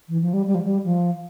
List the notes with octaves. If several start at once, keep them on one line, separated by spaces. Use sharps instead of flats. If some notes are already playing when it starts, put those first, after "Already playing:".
E3
F3
G3
G3
F3
G3
F3